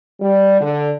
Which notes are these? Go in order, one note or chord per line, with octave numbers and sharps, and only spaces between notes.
G3
D3